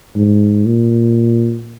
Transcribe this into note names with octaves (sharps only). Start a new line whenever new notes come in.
G#2
A#2